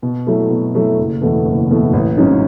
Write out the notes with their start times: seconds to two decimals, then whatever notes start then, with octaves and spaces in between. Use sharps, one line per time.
0.02 B2
0.27 F#3 A3 E4
0.50 B2
0.74 F#3 A3 E4
0.98 F#1
1.21 E2 B2 A3
1.45 F#1
1.69 E2 B2 A3
1.93 A1
2.17 G#2 F#3 C#4